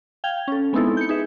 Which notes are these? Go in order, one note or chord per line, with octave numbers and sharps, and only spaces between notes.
F5 G5 G#6
C#4 A4
G#3 B3 C4 D#4 E4 A4
G6 C#7
D#4 G#4 B4 E5